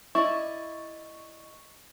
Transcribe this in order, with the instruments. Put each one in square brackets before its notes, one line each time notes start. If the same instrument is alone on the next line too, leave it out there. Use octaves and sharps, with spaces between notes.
[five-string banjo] E4 [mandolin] D5 D#5 [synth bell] C#6